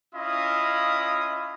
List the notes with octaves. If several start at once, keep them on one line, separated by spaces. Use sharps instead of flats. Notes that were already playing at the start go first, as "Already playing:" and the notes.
C#4 E4 F4 D#5 F5 D#6